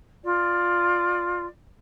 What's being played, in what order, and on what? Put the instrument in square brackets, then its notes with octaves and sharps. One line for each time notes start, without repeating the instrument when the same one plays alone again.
[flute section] F4 D5